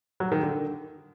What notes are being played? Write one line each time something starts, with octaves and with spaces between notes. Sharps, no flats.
F#3
D#3
D3